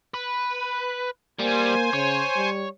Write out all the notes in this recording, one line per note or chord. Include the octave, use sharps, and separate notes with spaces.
B4
G3 A#3 C5 G#5
C#3 C#5
G3